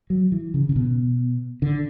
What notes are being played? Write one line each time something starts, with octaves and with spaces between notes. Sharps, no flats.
F#3
E3
C#3
C#3
B2
D3